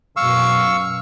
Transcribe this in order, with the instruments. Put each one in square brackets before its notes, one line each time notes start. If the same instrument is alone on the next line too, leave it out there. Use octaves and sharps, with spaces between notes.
[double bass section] F#2 B2 [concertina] F5 C#6 E6